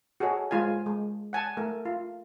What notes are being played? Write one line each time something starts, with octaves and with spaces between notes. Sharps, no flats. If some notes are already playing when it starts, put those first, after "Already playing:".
F#4 G#4 A4 C#5 D#5
G#3 F4 F5 G#5
G#3
F#5 G#5 A5
A3 A#4
F4